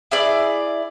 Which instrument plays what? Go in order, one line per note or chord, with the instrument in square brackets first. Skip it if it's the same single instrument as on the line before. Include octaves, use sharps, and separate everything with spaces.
[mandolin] E4 G#4 D5